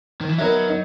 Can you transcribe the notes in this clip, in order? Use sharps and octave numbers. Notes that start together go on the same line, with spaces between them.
D#3
E3
F#3 B3 D#4 A#4 E5
D#4